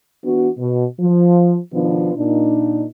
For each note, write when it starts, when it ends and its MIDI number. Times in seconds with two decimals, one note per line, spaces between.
0.24 0.48 52
0.24 0.48 59
0.24 0.48 62
0.24 0.48 66
0.59 0.84 47
1.00 1.56 53
1.72 2.11 47
1.72 2.11 51
1.72 2.11 53
1.72 2.11 59
1.72 2.11 62
1.72 2.11 65
2.16 2.84 46
2.16 2.84 62
2.16 2.84 63